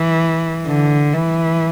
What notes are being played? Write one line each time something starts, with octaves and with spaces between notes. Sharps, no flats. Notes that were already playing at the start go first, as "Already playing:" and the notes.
Already playing: E3
D3
E3